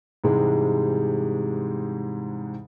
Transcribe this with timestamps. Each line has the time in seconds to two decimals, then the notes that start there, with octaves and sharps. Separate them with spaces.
0.24 G#2 C3 E3 G3 G#3